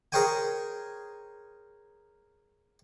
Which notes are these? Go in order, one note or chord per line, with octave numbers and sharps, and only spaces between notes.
G#4 A#4 C5 C#5 G5 G#5